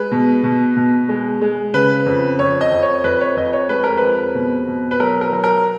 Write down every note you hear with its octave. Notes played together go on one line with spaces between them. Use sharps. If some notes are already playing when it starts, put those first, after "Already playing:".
Already playing: G#3 B4
B2
B2
B2
G#3
G#3
C#3 B4
F2
F2 C#5
D#5
F2
C#5
F2 B4
C#5
F2 D#5
C#5
G#3 B4
A#4
F2 B4
B2
B2
B4
F#3 A#4
A#4
F#3
A#4